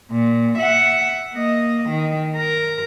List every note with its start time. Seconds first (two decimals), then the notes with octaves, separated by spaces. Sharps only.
0.12 A#2
0.58 E5 F#5
1.34 A#3 D#5
1.89 D#3
2.37 A#4